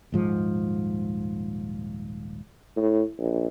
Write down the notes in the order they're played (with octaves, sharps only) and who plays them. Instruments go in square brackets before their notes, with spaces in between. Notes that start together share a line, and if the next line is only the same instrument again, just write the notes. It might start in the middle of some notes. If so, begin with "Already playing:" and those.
[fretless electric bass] D#1 G#2 F3
[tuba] A2
A#1